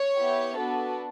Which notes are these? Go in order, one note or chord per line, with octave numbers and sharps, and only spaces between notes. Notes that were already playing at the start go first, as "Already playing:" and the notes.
Already playing: C#5
B3 E4 G4
B3 D4 F#4 A4